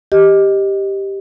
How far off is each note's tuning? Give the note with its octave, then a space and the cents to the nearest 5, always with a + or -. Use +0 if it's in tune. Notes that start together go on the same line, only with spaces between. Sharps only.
G4 +0 D#5 +0